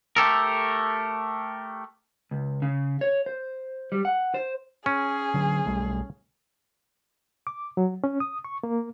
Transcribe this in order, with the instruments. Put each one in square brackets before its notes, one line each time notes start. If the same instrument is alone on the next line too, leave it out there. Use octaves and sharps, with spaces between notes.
[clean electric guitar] A3 G4 A4 A#4
C#2
C#3
C#5
C5
G3
F#5
C5
[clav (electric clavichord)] C#4 [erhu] G#4
[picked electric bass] D3 F#3
B1 G3 A3
[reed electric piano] D6
F#3
C#4
D#6
C#6
A#3